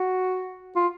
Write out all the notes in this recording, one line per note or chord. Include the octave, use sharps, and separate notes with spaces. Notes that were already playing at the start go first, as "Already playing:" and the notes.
Already playing: F#4
F4